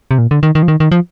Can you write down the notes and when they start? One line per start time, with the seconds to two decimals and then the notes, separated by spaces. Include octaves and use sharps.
0.11 C3
0.18 A#2
0.31 D3
0.43 D#3
0.55 D#3
0.63 F3
0.68 D#3
0.80 D#3
0.92 F3